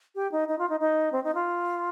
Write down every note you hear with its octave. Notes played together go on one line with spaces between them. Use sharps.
G4
D#4
D#4
F4
D#4
D#4
C4
D#4
F4